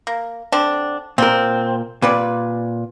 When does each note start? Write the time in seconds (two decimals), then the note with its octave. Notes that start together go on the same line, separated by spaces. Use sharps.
0.07 A#3
0.52 D3 C4 D4
1.18 A#2 C4 A#4
2.02 A#2 G3 B4 D5